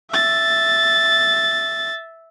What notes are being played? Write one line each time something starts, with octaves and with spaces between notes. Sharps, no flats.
E5 A6